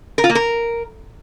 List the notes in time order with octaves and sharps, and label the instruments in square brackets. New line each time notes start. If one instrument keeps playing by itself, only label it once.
[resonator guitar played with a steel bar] A#4
F4
A#3
A#4